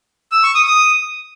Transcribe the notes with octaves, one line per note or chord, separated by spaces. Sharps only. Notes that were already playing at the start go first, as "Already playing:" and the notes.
E6
C#6
D#6
D#6